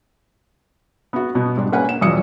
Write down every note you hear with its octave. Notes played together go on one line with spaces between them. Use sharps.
B3 F#4
B2 B3
G#2 G3 D4
A#3 C#4 B4 F#5 G#5
E7
E1 A1 F3 F#3 D#6 C#7